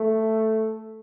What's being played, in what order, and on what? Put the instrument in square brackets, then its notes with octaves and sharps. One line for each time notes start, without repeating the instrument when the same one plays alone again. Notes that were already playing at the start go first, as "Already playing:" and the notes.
Already playing: [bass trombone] A3